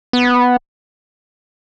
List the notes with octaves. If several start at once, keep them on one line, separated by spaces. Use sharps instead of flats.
B3